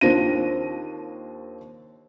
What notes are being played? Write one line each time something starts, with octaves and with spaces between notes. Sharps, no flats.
D#2 C4 D4 F4 A#6 D#7